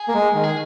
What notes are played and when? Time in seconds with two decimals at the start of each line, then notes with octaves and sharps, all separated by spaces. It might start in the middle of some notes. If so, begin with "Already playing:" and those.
Already playing: G#4
0.08 A#3
0.14 G#3
0.35 D#3
0.44 G#4